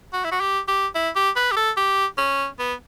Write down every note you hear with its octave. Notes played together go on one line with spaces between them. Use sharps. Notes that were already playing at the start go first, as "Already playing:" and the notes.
F#4
E4
F#4
G4
G4
E4
G4
B4
G4
A4
G4
C#4
B3